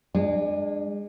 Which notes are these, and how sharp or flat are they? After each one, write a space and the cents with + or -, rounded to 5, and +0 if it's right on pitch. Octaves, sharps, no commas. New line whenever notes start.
G#3 -25 D4 +20